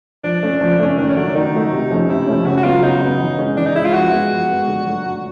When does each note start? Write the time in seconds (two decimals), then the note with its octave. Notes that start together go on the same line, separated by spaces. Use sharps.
0.24 F3 D4
0.43 A3 C#4
0.61 F3
0.79 A3 C#4
0.98 D#3 D4
1.08 C#4
1.16 F#3 A3 D4
1.35 D#3 D#4
1.53 F#3 A3
1.72 C3
1.90 F3 A3 C#4
2.09 C3 E4
2.27 F3 A3 C#4
2.46 C#3 F#4
2.57 F#4
2.64 F#3 B3 F4
2.83 C#3 D#4
3.01 F#3 B3
3.20 E3
3.38 G#3 C#4
3.57 E3 D4
3.66 D#4
3.75 G#3 C#4 E4
3.85 F4
3.94 F3 F#4
4.12 G#3 B3
4.31 F3
4.49 G#3 B3
4.68 D3
4.86 F#3 A3
5.04 D3